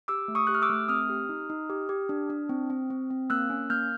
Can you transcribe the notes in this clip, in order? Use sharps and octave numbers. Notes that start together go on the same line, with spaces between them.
G4 D6 E6
A3
C#6 D#6
G4 F#6
F6
D6 E6
A3
C4 D#6 F6
G4
D#4
D#4
G4
G4
D4
D4
C4
C4
C4
C4
A#3 E6 F#6
C#4
A#3 F6 G6